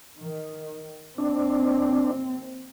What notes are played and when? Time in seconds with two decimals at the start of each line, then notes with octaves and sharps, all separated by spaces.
0.18 D#3
1.18 D#2 C4 D4